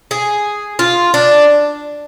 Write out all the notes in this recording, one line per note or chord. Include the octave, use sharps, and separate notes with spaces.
G#4
F4
D4